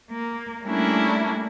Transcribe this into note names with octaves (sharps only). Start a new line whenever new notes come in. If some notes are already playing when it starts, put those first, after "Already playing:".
A#3
G3 A3 A#3 C#4 D4 E4